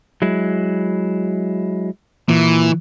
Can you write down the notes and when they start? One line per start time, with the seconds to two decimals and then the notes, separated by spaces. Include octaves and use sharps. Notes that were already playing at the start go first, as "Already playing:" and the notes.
0.22 F#3 G#3 E4
2.29 A#2 E3